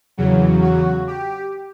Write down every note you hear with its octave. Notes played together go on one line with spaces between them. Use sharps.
E2 C#3 F#3
F#4
G4